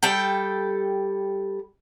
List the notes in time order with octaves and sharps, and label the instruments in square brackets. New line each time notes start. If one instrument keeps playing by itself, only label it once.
[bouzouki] G3 A4 G5